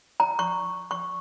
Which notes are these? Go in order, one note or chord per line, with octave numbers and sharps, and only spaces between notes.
A#5
C#6
C#6